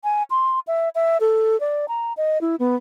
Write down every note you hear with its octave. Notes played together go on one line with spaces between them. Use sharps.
G#5
C6
E5
E5
A4
D5
A#5
D#5
E4
B3